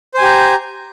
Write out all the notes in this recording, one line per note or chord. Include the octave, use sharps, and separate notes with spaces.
G4 C5 G#5 A#5